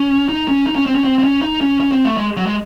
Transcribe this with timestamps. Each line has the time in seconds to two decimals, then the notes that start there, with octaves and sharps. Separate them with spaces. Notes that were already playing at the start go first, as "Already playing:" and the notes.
Already playing: C#4
0.29 D#4
0.48 C#4
0.67 D#4
0.76 C#4
0.86 C4
0.95 C#4
1.04 C4
1.18 C4
1.24 C#4
1.42 D#4
1.61 C#4
1.80 C#4
1.92 C4
2.05 A3
2.17 G#3
2.37 F#3
2.46 G#3